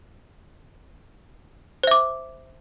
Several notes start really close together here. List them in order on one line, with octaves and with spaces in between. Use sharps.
C5 E5 D6